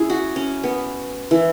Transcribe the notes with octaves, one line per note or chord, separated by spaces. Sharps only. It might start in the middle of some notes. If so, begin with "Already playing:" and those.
Already playing: C#4 E4 G#4
F#4
C#4
B3
E3